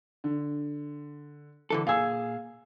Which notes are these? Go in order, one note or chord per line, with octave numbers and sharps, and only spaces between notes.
D3
D3 E3 A4
A#2 G#4 F5 G#5 E6